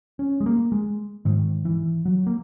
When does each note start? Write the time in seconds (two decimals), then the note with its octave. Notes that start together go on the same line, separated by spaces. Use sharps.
0.19 C#4
0.40 G#3
0.46 A#3
0.72 G#3
1.25 G#2 D#3
1.65 E3
2.05 F#3
2.27 A#3